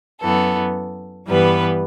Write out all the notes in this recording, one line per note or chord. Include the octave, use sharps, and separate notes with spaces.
F#2 E3 B3 A4
G2 E3 G3 B3 B4